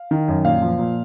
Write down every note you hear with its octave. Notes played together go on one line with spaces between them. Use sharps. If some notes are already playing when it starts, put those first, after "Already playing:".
Already playing: F5
D#3
F#2
A#2 F5
F3
A#2